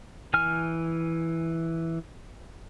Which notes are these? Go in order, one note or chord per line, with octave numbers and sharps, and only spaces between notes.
E3 G#5 F6